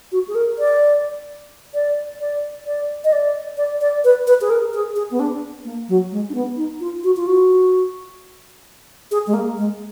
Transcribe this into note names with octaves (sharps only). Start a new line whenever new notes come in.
F#4
G#4
A#4
D5
D5
D5
D5
D#5
D5
D5
D5
B4
B4
G#4
A#4
G#4
G#4
B3
D4
A#3
F#3
G#3
D4
B3
D#4
F4
F#4
F4
F#4
G#4
G#3
A#3
G#3